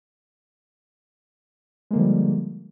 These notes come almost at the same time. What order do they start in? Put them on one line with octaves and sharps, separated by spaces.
G#3 A#3 D3 F3 G3